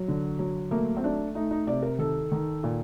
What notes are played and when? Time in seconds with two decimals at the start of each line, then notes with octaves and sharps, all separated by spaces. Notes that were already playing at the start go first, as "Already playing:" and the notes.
Already playing: F#3
0.08 D3
0.39 F#3
0.71 A3 A#3
0.97 C4
1.03 A3 D4
1.35 A3 D#4
1.51 D#4
1.67 C3 D5
1.83 A#4
1.98 D#3 A4
2.32 D#3
2.63 A#2